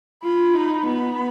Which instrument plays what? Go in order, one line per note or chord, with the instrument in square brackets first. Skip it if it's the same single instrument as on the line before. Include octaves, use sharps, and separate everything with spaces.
[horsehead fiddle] F4 [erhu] B5
[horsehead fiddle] D#4
[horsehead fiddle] B3 [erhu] B5